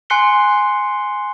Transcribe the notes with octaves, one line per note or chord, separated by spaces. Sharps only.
G#5 C6 F#6 C7 C#7 G7